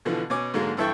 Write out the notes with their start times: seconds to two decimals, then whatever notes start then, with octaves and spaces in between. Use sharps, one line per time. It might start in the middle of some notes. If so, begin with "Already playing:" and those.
0.05 B2 D3 E3 F3
0.30 B2 C#4 G#5 D6
0.54 G#2 D3 F#3 G#3 A#3
0.77 G2 E3 A4 E5 G5 C#6